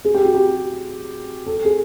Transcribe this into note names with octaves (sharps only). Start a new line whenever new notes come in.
G#4
G4
F#4
G4
A4
G#4